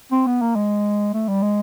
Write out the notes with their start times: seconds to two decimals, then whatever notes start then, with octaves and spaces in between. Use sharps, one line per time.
0.12 C4
0.27 B3
0.41 A#3
0.55 G#3
1.14 A3
1.28 G3
1.42 G#3